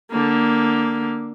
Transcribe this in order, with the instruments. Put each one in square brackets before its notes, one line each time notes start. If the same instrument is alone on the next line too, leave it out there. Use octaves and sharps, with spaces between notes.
[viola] D3 A#3